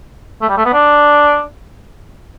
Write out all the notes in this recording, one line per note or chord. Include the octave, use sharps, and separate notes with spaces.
A3
G3
A3
B3
D4